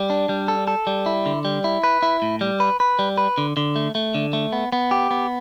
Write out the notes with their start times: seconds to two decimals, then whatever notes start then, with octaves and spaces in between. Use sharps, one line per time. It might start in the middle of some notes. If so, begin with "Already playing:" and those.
Already playing: G3
0.10 D4
0.29 G3
0.48 A4
0.68 A4
0.87 G3
1.06 E4
1.26 D3
1.45 G3
1.64 E4
1.84 B4
2.02 E4
2.22 A2
2.41 G3
2.60 B4
2.80 B4
2.99 G3
3.18 B4
3.38 D3
3.57 D3
3.76 A3
3.95 A3
4.15 D3
4.33 A3
4.53 B3
4.72 B3
4.91 G4
5.11 B3